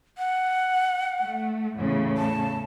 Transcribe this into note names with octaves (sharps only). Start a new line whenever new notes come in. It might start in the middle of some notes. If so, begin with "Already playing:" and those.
F#5
A3
E2 A2 C#3
A5